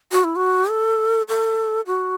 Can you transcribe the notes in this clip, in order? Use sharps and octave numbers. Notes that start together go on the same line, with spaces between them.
F#4
E4
F#4
A4
A4
F#4